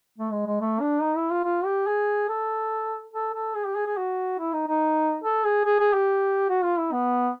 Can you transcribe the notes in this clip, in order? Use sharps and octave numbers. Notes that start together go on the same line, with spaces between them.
A3
G#3
G#3
A3
D4
D#4
E4
F4
F4
G4
G#4
A4
A4
A4
G#4
G4
G#4
G#4
F#4
E4
D#4
D#4
A4
G#4
G#4
G#4
G4
F#4
F4
E4
B3